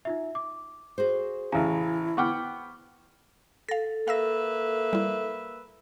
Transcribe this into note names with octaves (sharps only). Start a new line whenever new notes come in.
D#4 F4 E5
D6
F#4 G#4 C5
A1 C#3 E4 F5 G#5 A#5
B3 F#5 G5 C#6 D6 F6
A4 F5 A#6
A#3 B4 E5 F5 E6 A#6
G3 E4